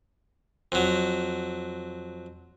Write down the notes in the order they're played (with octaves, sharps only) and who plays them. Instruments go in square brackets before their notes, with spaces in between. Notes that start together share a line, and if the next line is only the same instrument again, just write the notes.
[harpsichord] F2 F#3